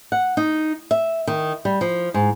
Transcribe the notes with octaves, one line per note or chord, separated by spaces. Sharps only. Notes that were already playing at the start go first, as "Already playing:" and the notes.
F#5
D#4
E5
D#3
G3
F3
G#2